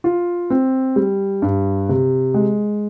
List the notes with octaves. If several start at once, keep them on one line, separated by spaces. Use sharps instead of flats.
F4
C4
G3
G2
C3
G#3